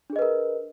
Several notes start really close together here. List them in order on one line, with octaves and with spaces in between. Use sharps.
D4 G#4 D#5 B4 A#4